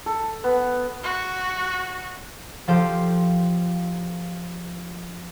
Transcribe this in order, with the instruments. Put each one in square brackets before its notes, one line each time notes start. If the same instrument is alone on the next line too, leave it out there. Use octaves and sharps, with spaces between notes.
[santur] A4
B3
[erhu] F#4
[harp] F3 F4 G4 A4 C5